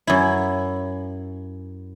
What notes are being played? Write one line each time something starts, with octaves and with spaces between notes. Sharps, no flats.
F#2 E4